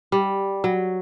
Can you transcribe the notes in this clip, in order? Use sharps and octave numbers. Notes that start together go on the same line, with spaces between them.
G3
F#3